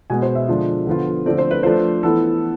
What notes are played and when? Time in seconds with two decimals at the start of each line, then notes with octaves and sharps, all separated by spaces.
0.10 B2 G#3 B3 G#5
0.22 C5
0.35 E5
0.48 D3 F3 G#3 D4 F4
0.87 D3 F3 B3 F4
1.26 D3 F3 A3 C4 D5
1.38 C5
1.51 B4
1.63 F3 A3 D4 F4 C5
2.03 E3 B3 E4 A4